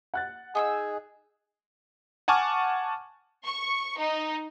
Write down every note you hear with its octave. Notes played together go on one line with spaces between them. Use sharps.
F#5 F#6 A6
D#4 G#4 G#5 C#6 E6
F#5 G#5 A5 C#6 D6 F6
C#6
D#4